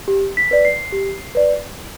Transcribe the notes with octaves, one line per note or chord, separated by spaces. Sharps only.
G4
B6
B4 D5
C7
G4
B4 D5